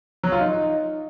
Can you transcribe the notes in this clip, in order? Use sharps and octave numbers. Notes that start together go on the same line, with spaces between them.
F#3
F4
D#4